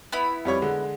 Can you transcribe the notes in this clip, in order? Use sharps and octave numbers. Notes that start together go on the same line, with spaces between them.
B3 E4 B5
F2 G3 C#5
D3 G#3